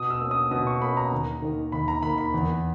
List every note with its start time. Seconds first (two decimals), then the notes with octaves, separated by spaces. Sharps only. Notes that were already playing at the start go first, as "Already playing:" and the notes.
Already playing: B2 D#6
0.10 E6
0.21 A#3 C#4
0.31 D#6
0.51 B2 D#6
0.67 C#6
0.82 A#3 C#4 B5
0.97 A#5
1.12 D#2
1.42 D#3 A#3
1.72 D#2 B5
1.88 A#5
2.03 D#3 A#3 B5
2.18 B5
2.34 E2